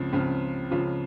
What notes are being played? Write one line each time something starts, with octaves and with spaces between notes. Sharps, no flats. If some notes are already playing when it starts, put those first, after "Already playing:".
Already playing: C#2 C#3 F3 C4
C#2 C#3 F3 C4 F4
C#2 C#3 F3 C4 F4